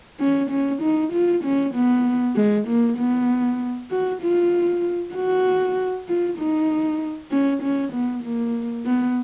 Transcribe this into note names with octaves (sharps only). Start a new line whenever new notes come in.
C#4
C#4
D#4
F4
C#4
B3
G#3
A#3
B3
F#4
F4
F#4
F4
D#4
C#4
C#4
B3
A#3
B3